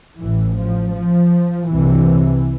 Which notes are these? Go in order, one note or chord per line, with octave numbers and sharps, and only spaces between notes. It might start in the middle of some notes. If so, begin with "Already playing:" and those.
A1 A2 E3
F3
F3
C2 C3 E3